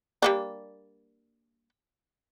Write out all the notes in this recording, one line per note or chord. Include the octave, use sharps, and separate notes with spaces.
G3 A#3 D4